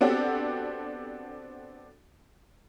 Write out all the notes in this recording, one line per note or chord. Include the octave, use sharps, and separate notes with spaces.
B3 C4 D4 F#4 G4 A4